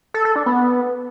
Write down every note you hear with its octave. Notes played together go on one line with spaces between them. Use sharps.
A4
A4
D4
B3